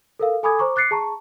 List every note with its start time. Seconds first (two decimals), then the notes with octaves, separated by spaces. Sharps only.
0.19 A4 A#4 F5
0.43 A4 G#5 B5 D6 D#6 G#6
0.59 C5 A#5 C#6 D6
0.76 D6 F#6 A6 C7 C#7
0.91 G#4 A5 A#5 C#6